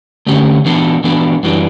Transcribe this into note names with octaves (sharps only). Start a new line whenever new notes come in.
D3 A3 C#4 G4
E3 B3 D4 A4
E3 B3 D4 A4
F#2 E3 G3 D4